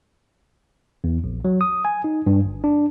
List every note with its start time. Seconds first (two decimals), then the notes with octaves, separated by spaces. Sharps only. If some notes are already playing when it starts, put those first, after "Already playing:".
1.04 E2
1.24 A#1
1.45 F#3
1.61 D#6
1.85 G#5
2.04 D#4
2.26 G2
2.45 G1
2.64 D4